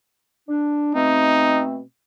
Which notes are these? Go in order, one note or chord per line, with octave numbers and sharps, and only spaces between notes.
D4
B2 A3 C4 D#4